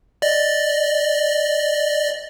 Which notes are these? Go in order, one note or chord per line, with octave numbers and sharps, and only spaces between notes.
D5 D#5